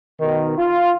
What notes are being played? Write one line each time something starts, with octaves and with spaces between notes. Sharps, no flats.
B2 D#3
F4